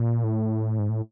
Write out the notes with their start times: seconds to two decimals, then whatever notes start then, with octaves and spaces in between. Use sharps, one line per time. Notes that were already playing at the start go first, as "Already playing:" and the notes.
Already playing: A#2
0.24 A2
0.79 G#2
0.89 A2